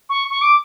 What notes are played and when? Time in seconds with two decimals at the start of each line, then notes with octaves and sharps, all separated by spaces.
0.10 C#6
0.30 C#6
0.42 D6